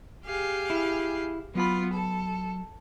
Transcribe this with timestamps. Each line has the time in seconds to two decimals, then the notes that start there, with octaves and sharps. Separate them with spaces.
0.25 G4 G#4 F5
0.70 E4
1.55 F#3 B3 F4 B5
1.93 A4